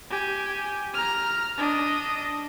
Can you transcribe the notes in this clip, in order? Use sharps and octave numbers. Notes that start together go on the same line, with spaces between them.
G4 G#5
A#5 F6
D4 D#5